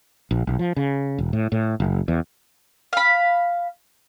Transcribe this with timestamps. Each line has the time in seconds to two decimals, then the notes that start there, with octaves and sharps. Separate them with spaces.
0.31 A#1
0.47 B1
0.59 F3
0.76 C#3
1.18 E1
1.33 A2
1.52 A2
1.80 F#1
2.08 E2
2.93 F5 B5